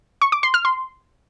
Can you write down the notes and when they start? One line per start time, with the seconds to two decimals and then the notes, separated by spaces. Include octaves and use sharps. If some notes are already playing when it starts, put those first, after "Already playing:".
0.22 C#6
0.32 D6
0.43 C6
0.54 F6
0.65 C6